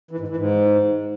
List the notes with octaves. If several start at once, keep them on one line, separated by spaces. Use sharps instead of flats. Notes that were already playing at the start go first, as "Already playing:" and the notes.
E3
G#2
E3
G#2